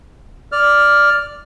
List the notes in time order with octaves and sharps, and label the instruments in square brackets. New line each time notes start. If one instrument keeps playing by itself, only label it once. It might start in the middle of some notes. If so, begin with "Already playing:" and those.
[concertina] D5 F6